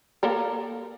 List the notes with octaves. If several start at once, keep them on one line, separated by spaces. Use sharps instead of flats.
A#3 A4 A#4